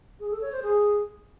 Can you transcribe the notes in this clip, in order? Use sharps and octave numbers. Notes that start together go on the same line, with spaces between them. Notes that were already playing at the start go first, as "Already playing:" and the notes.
G#4
A4
C#5
C5
G#4